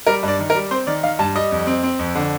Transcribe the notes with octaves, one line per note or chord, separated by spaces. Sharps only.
G3 A#4
G2 D5
D#3
A#4
G3
C4 C5
D#3 D5
D#3 F5
G2 A5
G3 D#5
F2
C4
C4
F2
D3